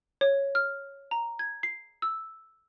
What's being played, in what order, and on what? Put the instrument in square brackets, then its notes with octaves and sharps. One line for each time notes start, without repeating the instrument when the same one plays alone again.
[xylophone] C#5
F6
A#5
G#6
C7
E6